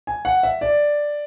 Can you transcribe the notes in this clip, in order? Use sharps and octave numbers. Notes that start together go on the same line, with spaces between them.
G#5
F#5
E5
D5